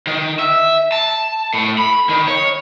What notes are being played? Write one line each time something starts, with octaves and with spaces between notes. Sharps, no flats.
D#3
E5
A5
A2
B5
D#3
C#5